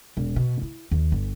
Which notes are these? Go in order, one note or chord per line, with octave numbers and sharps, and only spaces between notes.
E1
B2
E4
D#2
G1